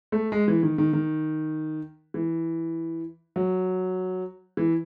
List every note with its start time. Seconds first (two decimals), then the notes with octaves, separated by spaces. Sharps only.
0.12 A3
0.32 G#3
0.48 E3
0.63 D#3
0.78 D#3
0.93 D#3
2.14 E3
3.36 F#3
4.57 E3